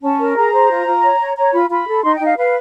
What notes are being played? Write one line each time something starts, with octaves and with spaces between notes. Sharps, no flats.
C#4 A5
A#4
G#4 A#5
C5
F4
F4
C#5
C#5
C#5 A#5
F4 B5
F4 B5
A4
D#4 C6
G5
D#4
F5
B4 F5